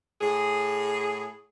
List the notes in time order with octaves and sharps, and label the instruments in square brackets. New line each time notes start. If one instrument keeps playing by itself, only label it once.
[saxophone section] A2 G#4